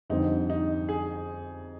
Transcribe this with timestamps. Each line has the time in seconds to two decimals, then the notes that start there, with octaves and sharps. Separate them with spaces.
0.10 F2 D3 G3 C4 D#4
0.50 D#4
0.89 G#4